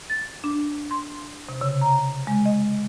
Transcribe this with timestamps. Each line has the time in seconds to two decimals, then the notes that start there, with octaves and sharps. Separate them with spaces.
0.10 A6
0.44 D4
0.91 C6
1.49 C3
1.61 C#3
1.81 A#5
2.27 G#3
2.45 D#5